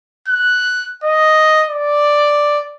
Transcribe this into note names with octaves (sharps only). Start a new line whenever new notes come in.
F#6
D#5
D5